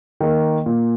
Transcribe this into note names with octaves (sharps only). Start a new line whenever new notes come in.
D#3 A#3
A#2